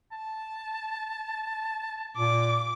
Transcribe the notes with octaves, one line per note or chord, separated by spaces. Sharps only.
A5
A#2 D6